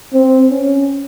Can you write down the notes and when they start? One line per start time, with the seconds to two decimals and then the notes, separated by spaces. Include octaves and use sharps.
0.14 C4
0.50 C#4